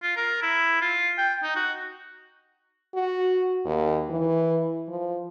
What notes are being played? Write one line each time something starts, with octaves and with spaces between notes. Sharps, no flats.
F4
A#4
E4
F4
G5
D#4
F#4
F#4
D#2
E3
F3